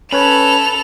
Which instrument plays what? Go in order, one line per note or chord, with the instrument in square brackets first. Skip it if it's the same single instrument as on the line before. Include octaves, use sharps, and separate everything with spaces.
[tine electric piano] C#4 B4 C#5 [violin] A4 F7 [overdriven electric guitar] B5